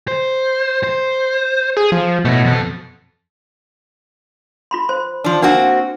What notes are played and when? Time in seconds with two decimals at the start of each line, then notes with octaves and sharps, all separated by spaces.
0.08 C5
0.84 C5
1.77 G#4
1.92 F3
2.25 B2 A3 E4
2.45 F2 A4
4.71 F4 B5 C6
4.89 C5 C6
5.24 F3 D4
5.42 A#3 C4 D4 F#4